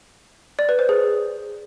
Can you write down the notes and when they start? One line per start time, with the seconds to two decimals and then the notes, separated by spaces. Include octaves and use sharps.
0.59 D5
0.69 B4
0.79 C5
0.89 G#4